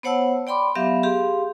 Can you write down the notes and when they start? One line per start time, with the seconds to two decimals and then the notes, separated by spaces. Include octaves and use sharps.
0.03 B3 C5 C#5 F#5 A5 E6
0.47 D5 G5 B5 C6 D6
0.75 F#3 B3 G4 E5 F5
1.03 G4 G#4 F5 C6